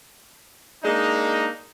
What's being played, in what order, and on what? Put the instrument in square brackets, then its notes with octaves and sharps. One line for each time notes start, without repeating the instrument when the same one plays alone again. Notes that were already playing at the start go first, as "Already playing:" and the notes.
[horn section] G#3 A#3 D4 D#4